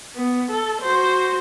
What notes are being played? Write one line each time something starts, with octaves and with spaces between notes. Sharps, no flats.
B3
A4
F#4 C5